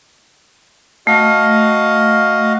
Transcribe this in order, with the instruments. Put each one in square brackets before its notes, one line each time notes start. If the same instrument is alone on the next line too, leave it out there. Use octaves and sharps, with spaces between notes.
[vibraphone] A3 [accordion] F#4 D#5 F5